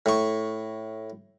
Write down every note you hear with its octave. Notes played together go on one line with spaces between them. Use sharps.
A2 C#6